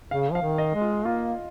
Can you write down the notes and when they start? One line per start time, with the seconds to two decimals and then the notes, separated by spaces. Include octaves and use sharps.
0.11 C#3 F5
0.32 F3 F5
0.42 D#3
0.58 D#5
0.74 G#3
0.81 F4
1.05 A#3 F4